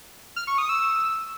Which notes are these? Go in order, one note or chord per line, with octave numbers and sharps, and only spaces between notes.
F6
C#6
D#6
E6